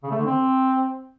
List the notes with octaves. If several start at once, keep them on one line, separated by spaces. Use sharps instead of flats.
C#3
A3
D3
C4